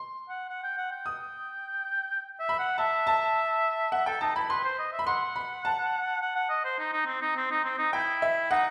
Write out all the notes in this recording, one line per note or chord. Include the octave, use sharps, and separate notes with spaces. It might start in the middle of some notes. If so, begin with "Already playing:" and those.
Already playing: C6
F#5
F#5
G5
F#5
G5
D#6
E5
B5
F#5
E5 A5
A5
E5 F#5
A4 G5
D#4 A5
E4 B5
B4 C6
C5
D#5
E5
B5
F#5 C6
B5
A5
F#5
F#5
D#5
C5
D#4
D#4
C4
D#4
C4
D#4
C4
D#4
E4 G5
E5
D#4 F#5